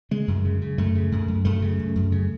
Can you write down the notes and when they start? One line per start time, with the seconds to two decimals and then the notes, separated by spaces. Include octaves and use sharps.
0.11 C#3 G#3
0.28 F#2
0.45 C#3
0.62 C#3
0.78 F#2 A3
0.95 C#3
1.12 F#2
1.28 F#2
1.45 F#2 A3
1.62 C#3
1.79 F#2
1.96 F#2
2.12 C#3